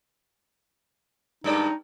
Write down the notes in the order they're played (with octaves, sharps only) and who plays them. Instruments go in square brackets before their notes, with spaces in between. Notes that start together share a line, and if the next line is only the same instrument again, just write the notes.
[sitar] G2 G#3 D5 [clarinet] D#4